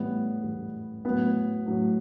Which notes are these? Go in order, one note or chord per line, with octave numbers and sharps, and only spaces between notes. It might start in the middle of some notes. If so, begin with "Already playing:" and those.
Already playing: A2 E3 G3 B3
A2 E3 G3
A2 F#3 B3
A2 F#3